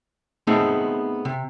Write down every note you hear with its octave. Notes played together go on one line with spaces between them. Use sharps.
A3 B3 C4 D#4 G#4
C3